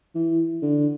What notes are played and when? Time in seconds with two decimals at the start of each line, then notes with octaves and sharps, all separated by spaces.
0.15 E3
0.62 D3